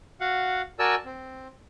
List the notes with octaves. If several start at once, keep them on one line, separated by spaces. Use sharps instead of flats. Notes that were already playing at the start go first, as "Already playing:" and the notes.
F#4 F5 F#5
F#4 A#4 D5 G#5 A5 E6
C4